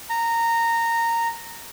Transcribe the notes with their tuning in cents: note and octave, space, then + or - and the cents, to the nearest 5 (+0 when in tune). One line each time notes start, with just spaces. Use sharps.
A#5 -15